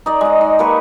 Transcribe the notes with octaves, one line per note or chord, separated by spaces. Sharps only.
D#4 D5 D#5
G#3 F#5
D#4
A#3 G4 B4 C#6